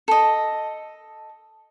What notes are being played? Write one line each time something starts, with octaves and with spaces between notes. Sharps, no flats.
A4 D#5